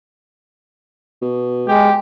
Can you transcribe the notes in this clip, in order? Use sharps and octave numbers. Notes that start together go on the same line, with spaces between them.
B2
G#3 G4